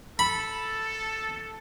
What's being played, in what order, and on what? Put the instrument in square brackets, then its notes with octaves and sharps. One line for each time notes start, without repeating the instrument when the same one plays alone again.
[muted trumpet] A4 [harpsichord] B5